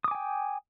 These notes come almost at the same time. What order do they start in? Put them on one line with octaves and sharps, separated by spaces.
D#6 D6 G#5 G5